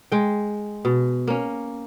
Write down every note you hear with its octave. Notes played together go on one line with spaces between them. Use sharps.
G#3 G5
B2
A#3 C#4